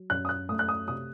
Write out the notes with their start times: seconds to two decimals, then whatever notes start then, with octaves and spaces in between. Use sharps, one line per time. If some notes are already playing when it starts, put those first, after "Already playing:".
Already playing: F#3
0.10 F#2 F#6
0.25 D#6
0.29 F#6
0.49 A3 D#6
0.59 F#6
0.69 D#6
0.88 C3 D#6